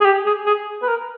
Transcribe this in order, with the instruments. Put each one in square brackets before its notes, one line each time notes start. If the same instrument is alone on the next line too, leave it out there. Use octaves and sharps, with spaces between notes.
[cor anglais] G#4
G4
G#4
G#4
B4
A#4